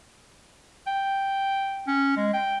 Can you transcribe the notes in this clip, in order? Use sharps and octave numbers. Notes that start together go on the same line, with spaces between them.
G5
C#4
G#3
G5